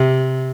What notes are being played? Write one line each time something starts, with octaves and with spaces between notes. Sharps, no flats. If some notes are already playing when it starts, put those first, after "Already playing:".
Already playing: C3